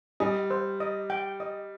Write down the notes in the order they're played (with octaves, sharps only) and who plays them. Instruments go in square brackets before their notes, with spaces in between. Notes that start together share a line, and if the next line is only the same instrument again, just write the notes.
[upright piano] G3 [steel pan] D#5
[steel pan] C5
D#5
G5
D#5